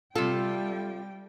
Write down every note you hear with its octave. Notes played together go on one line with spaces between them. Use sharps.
C3 G3 F4 A4 G5